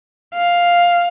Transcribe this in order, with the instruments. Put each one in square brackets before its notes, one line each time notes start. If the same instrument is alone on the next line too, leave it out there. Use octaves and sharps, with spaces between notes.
[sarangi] F5